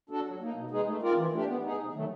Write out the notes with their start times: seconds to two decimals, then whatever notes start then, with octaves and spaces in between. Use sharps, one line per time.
0.09 D4 F#4 A4
0.25 F#3
0.40 A#3 D#4
0.55 B2
0.70 G#3 B3 D#4 G#4
0.87 A3
1.02 C4 F4 A#4 D5
1.16 E3
1.32 A3 D4 G4
1.48 B3
1.63 D#4 G#4
1.79 C3
1.93 D#3 F#3 A3